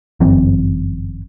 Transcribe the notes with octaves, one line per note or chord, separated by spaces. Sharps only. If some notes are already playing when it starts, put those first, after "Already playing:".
G1 F#2 E3 C4